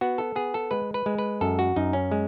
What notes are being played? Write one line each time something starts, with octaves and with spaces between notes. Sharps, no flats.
B3 F#4
A4
B3 G#4
A4
G#3 B4
B4
G#3
B4
F#2 A4
F#4
F#2 D#4
C#4
G#3